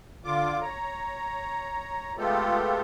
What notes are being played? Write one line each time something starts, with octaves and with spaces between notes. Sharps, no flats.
D3 F4 D6
C#5 A#5
G#3 A3 B3 F4 G4 A4